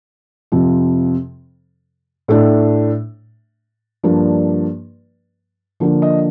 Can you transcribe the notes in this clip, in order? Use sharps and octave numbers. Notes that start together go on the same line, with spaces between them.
F2 C3 F3
A2 A3 D4
G2 F3 A#3 D4
D3 F3 A#3 D4
D#5